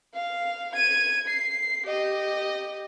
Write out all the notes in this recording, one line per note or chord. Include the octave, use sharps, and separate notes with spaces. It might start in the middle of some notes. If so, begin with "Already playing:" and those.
F5
G#6 D#7
C7
G4 D#5